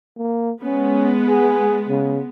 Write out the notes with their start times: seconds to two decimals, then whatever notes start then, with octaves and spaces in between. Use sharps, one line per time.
0.18 A#3
0.64 G#3 B3 C#4
1.28 G#4
1.89 C#3